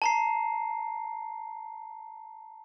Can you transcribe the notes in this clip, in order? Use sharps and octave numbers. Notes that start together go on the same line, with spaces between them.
A5 A#5 C7